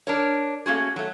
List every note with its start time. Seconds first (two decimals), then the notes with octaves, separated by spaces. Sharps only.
0.07 D4 A#4 C#5
0.66 A3 A#3 C#4 F#4 G#4
0.96 F#3 A3